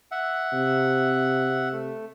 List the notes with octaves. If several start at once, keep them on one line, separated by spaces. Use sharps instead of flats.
E5 F#5
C3
A3